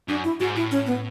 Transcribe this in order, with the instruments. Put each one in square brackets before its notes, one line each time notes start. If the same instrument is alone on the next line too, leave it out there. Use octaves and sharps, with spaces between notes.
[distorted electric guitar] F#2 [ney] D4
[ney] E4
[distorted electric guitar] G#2 [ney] F#4
[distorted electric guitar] A2 [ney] E4
[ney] C#4
B3